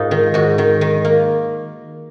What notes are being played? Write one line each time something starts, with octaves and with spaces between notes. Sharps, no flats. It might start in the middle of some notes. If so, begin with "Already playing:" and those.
Already playing: G#2 D#4 F4 G#4 A#4
D#3
G#2 F#4
D#3
D#3
A#3